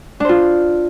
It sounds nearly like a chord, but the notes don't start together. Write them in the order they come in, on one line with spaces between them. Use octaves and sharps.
D4 C5 F4